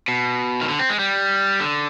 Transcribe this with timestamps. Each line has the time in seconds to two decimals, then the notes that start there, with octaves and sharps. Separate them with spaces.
0.08 B2
0.61 D#3
0.69 D3
0.79 C4
0.89 G#3
0.99 G3
1.60 D3